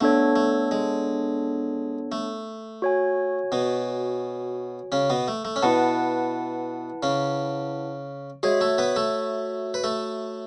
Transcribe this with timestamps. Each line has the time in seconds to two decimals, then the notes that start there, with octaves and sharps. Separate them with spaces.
0.01 A3 B3 D4 A4 C#5
0.36 A3
0.71 G#3
2.12 A3
2.82 F#4 C#5 G#5
3.52 B2 B3
4.92 C#3 C#4
5.10 B2 B3
5.28 A3
5.45 A3
5.56 C#4
5.63 B2 B3 E4 B4 F#5 A5
7.03 C#3 C#4
8.43 G#3 F#4 G#4 C#5 E5
8.61 A3 A4
8.78 B3 B4
8.96 A3 A4
9.74 B4
9.84 A3 A4